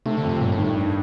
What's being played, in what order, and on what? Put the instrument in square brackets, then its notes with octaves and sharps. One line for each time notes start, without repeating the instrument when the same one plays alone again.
[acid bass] C3 [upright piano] A3
[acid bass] D3
[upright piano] F2
[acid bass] C3
[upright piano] G1 [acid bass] A#2
[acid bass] A2
[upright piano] D#3
[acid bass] G2
[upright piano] D4